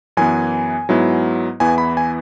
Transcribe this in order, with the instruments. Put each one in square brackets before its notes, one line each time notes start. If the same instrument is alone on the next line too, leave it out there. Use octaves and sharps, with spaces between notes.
[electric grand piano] F#2 E3 B3 G#5
G#2 F#3 B3 E4
E2 E3 B3 E4 G#5
B5
G#5